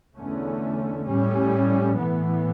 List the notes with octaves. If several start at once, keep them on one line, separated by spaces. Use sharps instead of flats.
E2 D3 A3 C#4
A2 G3 C#4
A2 E3 B3